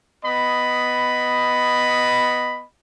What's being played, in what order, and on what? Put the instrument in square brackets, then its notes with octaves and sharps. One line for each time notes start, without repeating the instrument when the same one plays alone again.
[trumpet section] B3 D#5 B5